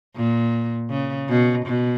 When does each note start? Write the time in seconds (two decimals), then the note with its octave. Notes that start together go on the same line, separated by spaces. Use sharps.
0.16 A#2
0.91 C#3
1.29 B2
1.66 B2